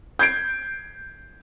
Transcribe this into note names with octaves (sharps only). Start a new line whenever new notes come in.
G6 G#6 C7 D7